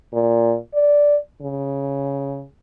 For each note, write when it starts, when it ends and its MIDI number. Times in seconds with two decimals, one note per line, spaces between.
0.13 0.56 46
0.74 1.16 74
1.41 2.44 49